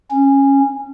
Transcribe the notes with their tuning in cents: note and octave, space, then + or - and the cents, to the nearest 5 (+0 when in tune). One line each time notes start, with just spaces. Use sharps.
C#4 -15